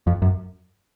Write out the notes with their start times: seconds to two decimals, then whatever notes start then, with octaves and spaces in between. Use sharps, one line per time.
0.07 F2
0.22 F#2